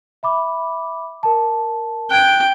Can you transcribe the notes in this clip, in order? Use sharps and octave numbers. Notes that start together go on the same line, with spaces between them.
E5 B5 D6
A#4 A5
G5 F#6 G#6 D7